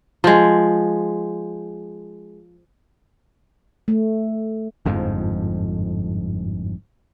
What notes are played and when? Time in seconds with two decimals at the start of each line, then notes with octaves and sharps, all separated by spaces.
0.24 F3 G#3
3.88 A3
4.85 G1 F2 G#2 F3